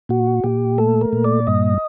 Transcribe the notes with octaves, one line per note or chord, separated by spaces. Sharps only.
A#2 F#4
A#2 G4
A3 A4
A#4
A#2
D5
G2 D#5